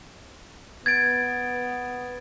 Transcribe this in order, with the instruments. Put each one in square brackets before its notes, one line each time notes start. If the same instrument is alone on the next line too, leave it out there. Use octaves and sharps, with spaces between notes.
[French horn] B3 [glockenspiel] G#6 A6 D7